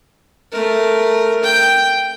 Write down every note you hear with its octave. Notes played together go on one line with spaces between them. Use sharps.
A3 A#4
G5